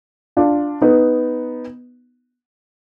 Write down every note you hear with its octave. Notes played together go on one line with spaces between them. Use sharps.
D4 F4
B3 D#4